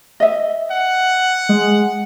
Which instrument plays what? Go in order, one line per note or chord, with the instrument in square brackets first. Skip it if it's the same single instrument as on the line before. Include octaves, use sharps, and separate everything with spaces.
[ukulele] D#5 E5
[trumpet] F#5
[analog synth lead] G#3